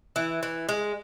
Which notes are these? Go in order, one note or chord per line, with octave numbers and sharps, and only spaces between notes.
E3
E3
G#3